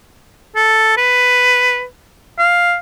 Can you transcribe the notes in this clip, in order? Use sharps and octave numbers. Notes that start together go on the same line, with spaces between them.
A4
B4
F5